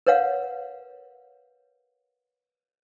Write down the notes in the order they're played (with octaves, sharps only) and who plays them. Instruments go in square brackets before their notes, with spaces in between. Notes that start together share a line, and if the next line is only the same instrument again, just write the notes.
[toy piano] A#4 B4 C#5 F5 F#5